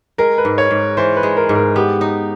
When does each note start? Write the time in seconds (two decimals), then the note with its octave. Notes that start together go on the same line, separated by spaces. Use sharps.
0.18 G#3 A#4
0.38 B4
0.45 G#2
0.58 C#5
0.71 G#2
0.97 E3 C5
1.16 B4
1.23 G#3
1.37 A#4
1.49 G#2
1.55 A#4
1.76 B3 G4
2.01 D#4